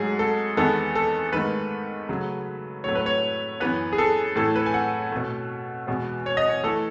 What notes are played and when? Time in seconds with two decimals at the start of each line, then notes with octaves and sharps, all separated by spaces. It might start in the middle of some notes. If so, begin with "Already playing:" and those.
Already playing: G#2 F#3 A3 G#4
0.19 A4
0.57 E2 D#3 G#3 B3 A4
0.95 A4
1.32 G#2 D#3 A3 B4
2.09 C#3 F#3 A3
2.84 A2 F#3 A3 C#5
2.95 B4
3.06 C#5
3.60 F#2 E3 B3 B4
3.93 G#4
3.98 A4
4.36 A2 E3 A3 A4
4.56 B4
4.66 G#5
4.74 F#5
5.12 B2 A3
5.87 E2 B2 G#3 B3
6.26 C#5
6.37 D#5
6.49 C#5
6.63 E3 A3 A4